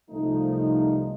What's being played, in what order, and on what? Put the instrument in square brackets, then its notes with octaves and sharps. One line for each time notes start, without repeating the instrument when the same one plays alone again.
[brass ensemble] C2 F3 A3 D#4